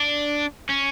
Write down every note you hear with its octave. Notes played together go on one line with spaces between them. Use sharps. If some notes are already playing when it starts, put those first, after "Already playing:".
Already playing: D4
C#4